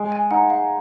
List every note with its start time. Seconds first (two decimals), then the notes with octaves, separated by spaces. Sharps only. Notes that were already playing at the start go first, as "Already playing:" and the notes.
Already playing: G#3
0.12 G#5
0.31 D#4 F#5
0.50 F5